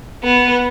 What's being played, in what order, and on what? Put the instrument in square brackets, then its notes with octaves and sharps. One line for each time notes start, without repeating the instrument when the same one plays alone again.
[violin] B3